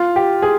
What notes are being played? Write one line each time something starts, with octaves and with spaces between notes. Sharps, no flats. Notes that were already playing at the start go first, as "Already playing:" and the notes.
Already playing: F4
G4
G#4